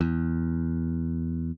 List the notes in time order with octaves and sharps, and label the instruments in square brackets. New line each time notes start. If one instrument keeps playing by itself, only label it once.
[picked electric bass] E2